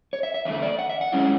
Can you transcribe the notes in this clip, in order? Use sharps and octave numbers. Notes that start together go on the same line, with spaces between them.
C#5
E5
E5
E2 D3 A3 E5
D5
F#5
E5
F#5
G#3 C#4 E4